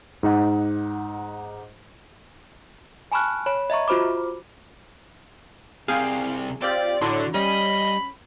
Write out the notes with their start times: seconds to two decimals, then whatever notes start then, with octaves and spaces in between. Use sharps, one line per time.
0.23 G#2 D#4 F#5
3.12 G#5 A5 B5 C#6 F6 F#6
3.46 C#5 B5
3.70 D#5 E5 A#5 C#6
3.88 F4 F#4 C5 B5 D6
5.88 C2 C3 G#4 F5 G5
6.62 C4 F4 G4 D5
7.01 A2 D3 F#3 D4 E4 F#4 C6
7.34 G3 C#4 D#5 B5